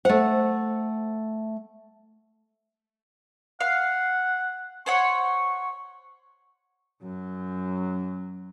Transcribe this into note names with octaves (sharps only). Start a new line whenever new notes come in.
A3 C5 F#5
F5 F#5
C5 C#5 F#5 C#6
F#2 F#3